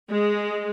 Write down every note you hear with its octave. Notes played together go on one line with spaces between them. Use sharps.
G#3